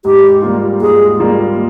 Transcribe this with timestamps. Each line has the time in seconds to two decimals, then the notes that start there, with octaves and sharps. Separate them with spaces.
0.05 G#2 G4
0.42 G3 A#3 F4
0.81 G#2 G#4
1.19 G3 A#3 F4